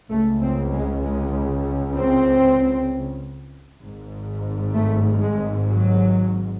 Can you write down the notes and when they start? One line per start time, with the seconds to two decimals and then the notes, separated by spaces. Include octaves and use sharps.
0.10 C#2 C#3 A3
0.41 C4
0.72 G#3
1.03 G#3
1.96 C4
3.82 G#1 G#2
4.74 A3
5.21 G#3
5.67 F#3